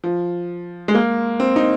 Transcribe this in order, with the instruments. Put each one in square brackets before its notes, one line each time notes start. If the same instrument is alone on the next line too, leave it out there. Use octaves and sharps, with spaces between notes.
[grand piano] F3
G#3
A#3
C4
D#4